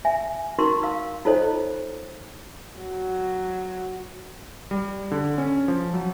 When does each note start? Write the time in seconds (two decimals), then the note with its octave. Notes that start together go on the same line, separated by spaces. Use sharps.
0.05 E5 G#5
0.58 D#4 F#4 A#4 C6 C#6
0.83 F5 E6
1.25 D#4 F4 A4 C5 C#5 D#5
2.78 F#3
4.71 G3
5.11 D3
5.38 C#4
5.68 F3
5.93 F#3